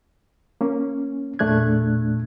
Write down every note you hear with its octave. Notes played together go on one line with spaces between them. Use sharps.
A#3 C#4
E2 A#2 A3 D4 F#6 G#6